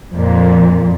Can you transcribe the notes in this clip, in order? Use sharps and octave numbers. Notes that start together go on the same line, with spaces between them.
F2 A#2